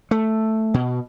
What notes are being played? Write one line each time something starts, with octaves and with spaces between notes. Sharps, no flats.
A3
B2